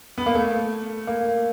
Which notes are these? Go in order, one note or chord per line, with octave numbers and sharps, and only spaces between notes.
B3
A#3
A3
A#3